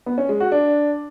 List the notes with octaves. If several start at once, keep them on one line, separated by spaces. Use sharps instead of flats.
B3
C#4
G#3
F#4
D4